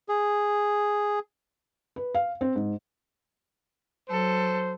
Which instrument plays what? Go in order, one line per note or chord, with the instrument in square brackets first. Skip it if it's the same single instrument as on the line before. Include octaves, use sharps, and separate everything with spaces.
[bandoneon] G#4
[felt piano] B4
F5
C4
G#2
[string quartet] F#3 A4 [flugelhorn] C5